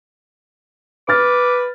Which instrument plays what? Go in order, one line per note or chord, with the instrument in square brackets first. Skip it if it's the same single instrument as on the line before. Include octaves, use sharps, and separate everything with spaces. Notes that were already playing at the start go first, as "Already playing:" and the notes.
[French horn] B4 [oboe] D6 [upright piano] F6 A6